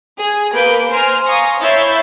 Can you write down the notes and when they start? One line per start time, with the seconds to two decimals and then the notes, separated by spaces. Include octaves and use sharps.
0.18 G#4
0.53 A#3 B4 G6 D7
0.90 C5 G#5 A#5 C6 F6
1.25 F5 G#5 A#5 C6 C#6 D#6
1.59 E4 C#5 E5 G6 A6 C7